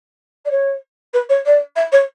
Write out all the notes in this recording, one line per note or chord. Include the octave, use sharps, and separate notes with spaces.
D5
C#5
B4
C#5
D5
E5
C#5